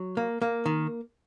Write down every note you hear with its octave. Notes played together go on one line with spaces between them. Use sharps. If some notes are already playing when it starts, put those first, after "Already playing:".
Already playing: F#3
A#3
A#3
D#3